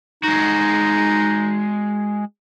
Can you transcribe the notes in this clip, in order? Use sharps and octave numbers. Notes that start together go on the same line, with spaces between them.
G#3 D#4 F#4